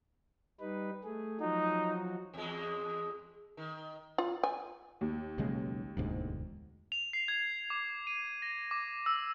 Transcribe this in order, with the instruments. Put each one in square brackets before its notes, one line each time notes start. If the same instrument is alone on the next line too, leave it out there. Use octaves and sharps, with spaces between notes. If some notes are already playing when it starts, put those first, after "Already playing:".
[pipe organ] G3 D#4 B4
A3 G#4
[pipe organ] F3 F#3 F#4 [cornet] D#4
[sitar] E2 G#3
D#3
[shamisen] F4
G#5
[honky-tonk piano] D#2
[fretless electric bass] B1 C#3 G#3
E1 D2 G#2
[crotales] F7
C7
G#6
D6
D#7
A#6
D6
E6